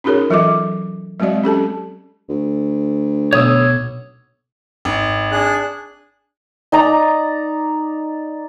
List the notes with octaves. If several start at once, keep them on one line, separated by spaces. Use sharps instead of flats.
C#4 D#4 F#4 G#4 A#4 C#5
E3 F#3 F4 A4 D#5 D6
F#3 G#3 C4 F#4 D5 D#5
C#4 G4 A4 A5
D2
B1 C#5 D#6 E6
G#1
D4 G#4 F#6
D#4 D5 A#5